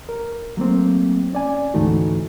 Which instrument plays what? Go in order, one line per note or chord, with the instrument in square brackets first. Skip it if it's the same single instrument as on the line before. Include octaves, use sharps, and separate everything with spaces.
[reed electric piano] A#4
F#3 A3 A#3 C4
C#4 D5 G#5
D2 G#2 E3 A3 D#4 F#4